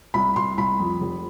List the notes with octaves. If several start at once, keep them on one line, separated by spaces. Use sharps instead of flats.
C2 B5
C2 C6
C2 B5
F2
F1